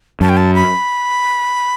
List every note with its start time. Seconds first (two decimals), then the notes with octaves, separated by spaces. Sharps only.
0.21 F#2 A5
0.29 G5
0.37 A5
0.55 B5